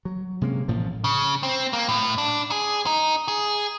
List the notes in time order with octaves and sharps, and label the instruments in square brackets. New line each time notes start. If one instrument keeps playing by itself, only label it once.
[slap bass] F#3
C3 G#3 A#3 C#4
A1 A2 F3 A#3
[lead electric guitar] C#3
C4
A#3
A2
D4
G#4
D#4
G#4